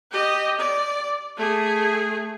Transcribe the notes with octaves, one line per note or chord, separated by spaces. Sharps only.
G4 D#5
D5
A3 G#4